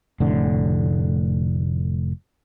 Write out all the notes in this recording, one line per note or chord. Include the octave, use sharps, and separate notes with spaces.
F1 A2 D3